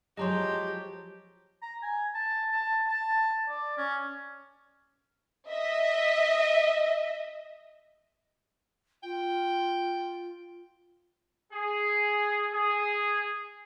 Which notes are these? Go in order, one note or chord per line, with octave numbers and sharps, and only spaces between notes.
F3 F#3 G#3 G4 D#5 A#5 C6
A#5
G#5
A5
A5
A5
D5
C#4
D#5 E5
F4 G5
G#4
G#4